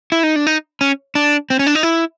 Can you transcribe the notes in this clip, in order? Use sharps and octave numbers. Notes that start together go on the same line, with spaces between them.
E4
D#4
D4
D#4
C#4
D4
C4
C#4
D4
D#4
E4